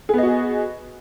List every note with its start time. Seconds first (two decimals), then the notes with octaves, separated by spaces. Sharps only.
0.09 G#4
0.14 B3
0.18 D#5
0.23 F#4